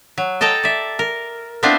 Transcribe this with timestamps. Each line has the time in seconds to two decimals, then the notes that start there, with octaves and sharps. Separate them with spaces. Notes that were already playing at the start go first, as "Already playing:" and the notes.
0.18 F#3
0.41 A4 D#5 G5 A5 A#5
0.63 D5 E5
0.99 A#4
1.63 B3 C4 D4 E4 F4 C5